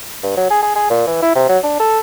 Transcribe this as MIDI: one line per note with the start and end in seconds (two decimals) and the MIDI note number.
0.23 0.36 43
0.37 0.46 54
0.50 0.61 68
0.62 0.75 68
0.76 0.86 68
0.90 1.07 46
1.07 1.20 52
1.22 1.33 64
1.35 1.47 48
1.49 1.58 54
1.63 1.78 62
1.80 2.00 69